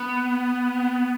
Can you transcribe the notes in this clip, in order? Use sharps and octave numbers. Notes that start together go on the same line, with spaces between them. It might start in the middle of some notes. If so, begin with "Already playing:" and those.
Already playing: B3